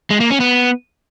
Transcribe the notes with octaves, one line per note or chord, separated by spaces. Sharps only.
G#3
A#3
C#4
B3